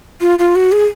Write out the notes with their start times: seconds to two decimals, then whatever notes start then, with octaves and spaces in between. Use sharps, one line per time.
0.21 F4
0.39 F4
0.56 F#4
0.72 G#4